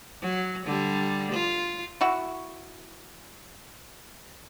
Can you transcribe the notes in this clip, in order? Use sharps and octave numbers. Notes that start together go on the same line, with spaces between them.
F#3
D3 G3
F4
E4 F#4